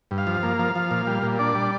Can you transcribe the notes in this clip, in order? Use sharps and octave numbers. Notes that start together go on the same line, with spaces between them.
G2
F5
F3
A#3
F3
F3
A#2
G3
A#2
D4 D5
G3